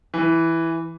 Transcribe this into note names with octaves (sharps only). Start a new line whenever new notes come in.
E3